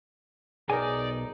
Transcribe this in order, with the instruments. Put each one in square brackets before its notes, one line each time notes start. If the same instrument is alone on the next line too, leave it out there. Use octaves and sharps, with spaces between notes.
[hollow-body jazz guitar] B1 G#5 [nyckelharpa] D#4 [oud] G#4 A#4 [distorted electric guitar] D5